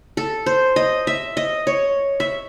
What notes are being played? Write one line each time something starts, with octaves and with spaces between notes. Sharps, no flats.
A4
C5
D#5
E5
D#5
C#5
E5